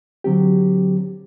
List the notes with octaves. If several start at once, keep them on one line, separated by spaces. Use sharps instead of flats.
D3 F#3 C4 G4